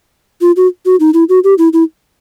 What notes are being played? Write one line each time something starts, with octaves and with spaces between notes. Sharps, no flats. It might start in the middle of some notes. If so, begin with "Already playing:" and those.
F4
F#4
F#4
D#4
E4
F#4
G4
E4
E4